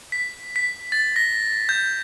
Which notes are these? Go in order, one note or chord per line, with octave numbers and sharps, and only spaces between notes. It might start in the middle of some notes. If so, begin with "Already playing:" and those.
B6
B6
A6
A#6
G6